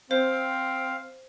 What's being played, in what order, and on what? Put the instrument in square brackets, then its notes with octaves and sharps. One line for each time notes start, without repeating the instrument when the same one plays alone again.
[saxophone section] C4 [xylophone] C5 [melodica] F5